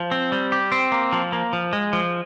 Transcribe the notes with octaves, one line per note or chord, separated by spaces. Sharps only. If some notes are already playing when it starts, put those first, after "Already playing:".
Already playing: F3
C4
G3
G4
C4
A#3
F3
A#3
F3
G#3
F3